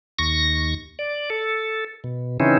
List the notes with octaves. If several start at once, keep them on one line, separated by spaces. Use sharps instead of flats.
D#2 C#6 A#6
D5
A4
B2
C#3 E3 C4 C#4 D#4 E4